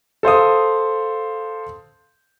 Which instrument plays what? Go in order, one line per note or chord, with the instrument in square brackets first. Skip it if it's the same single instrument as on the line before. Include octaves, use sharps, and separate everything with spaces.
[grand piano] A4 C5 F5 D#6